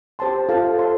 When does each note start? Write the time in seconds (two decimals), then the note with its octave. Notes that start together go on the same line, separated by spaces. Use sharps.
0.19 G4 C5 A5 C6
0.49 F4 A4 F5 A5
0.78 C5 F5 A5 C6